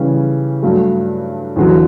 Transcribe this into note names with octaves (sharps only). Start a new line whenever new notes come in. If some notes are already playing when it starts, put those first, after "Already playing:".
Already playing: C#3 E3 G3 C#4
G2 F#3 A3
E2 D3 F#3